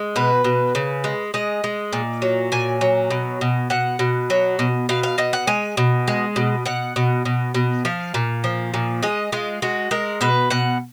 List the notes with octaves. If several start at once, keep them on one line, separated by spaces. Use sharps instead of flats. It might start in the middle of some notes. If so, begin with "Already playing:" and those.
Already playing: G#3
B2 B4
B2
C#3
G#3
G#3 D#5
G#3
A#2
F#3
A#2 G#5
F#3
B2
B2
B2 F#5
B2
F#3
B2
B2 F5
F5
B2 D#5
F#5
G#3 G#5
B2
G#3
B2
B2 F#5
B2
B2
B2
F3 F5
A#2
F3
A#2
G#3 D#5
G#3 F4
G#3 F#4
G#3 A#4
B2 B4
B2 F#5